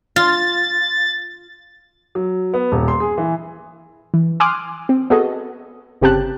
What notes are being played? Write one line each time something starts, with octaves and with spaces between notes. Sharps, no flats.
F4 A6
F#3
B3
D#1
C6
G#4
E3
E3
G#5 C6 D6 D#6 F6 F#6
C4
B3 F#4 G#4 A4 D#5
G1 C#3 C4 G4 A5 F#6